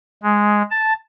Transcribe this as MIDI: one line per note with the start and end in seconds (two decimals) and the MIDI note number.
0.23 0.62 56
0.71 0.93 81